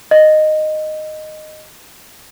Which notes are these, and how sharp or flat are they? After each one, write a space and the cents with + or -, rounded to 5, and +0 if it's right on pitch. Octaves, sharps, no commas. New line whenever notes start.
D#5 -10